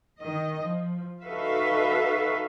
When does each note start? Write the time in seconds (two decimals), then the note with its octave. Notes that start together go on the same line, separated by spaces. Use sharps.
0.20 D#3 D#5
0.61 F3
1.23 D#4 F#4 A4 B4 E5 F5